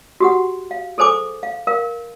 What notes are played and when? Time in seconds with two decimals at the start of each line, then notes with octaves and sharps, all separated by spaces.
0.20 F#4 G4 F#5
0.71 F5
0.98 G#4 A4 C5 G#5 D6
1.43 F5
1.67 A#4 F5